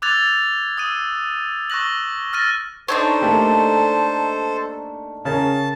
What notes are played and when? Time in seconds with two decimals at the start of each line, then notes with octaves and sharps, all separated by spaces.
0.02 D6 E6 F#6 G#6 A6 F7
0.77 D#6 E6 D#7
1.70 C#6 E6 F#6 A#6 F#7
2.33 E6 F6 A6 A#6 D#7
2.88 D4 D#4 A4 C5 C#5
3.21 A3 A#3 G4
5.25 C#3 C#4 A#4 A5